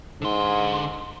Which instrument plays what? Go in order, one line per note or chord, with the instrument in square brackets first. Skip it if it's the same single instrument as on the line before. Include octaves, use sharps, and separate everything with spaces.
[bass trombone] G#2 [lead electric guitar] D3 C6